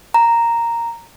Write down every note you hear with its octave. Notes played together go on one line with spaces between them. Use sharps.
A#5